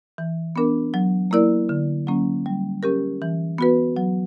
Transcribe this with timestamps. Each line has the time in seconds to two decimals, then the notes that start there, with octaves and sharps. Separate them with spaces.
0.18 E3
0.56 B3 D4 A#4
0.94 F#3
1.31 A#3 E4 A#4 D5
1.69 D3
2.07 F#3 A#3 C#4
2.46 G3
2.83 C#4 G4 A#4
3.22 E3
3.58 B3 F#4 B4
3.97 F#3